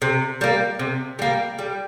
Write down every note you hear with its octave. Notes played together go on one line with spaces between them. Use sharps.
C3
G3 A#3
C3
G3 A#3
G3